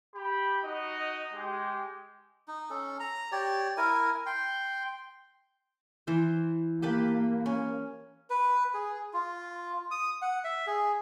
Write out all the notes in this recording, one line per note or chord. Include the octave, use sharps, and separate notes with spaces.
G4 B5
D#4 F#4 D#5
G#3 G4
D#4
C#4 A4
A#5
G4 C#5 D5
E4 A#4 G#5
G5 C6
E3 C5
A#3 G4 B4 A5
C#4
B4
G#4
F4
D#6
F#5
E5
G#4